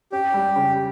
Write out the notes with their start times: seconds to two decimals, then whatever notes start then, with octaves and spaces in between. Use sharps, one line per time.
0.12 C#4 G4
0.34 G3
0.56 C#3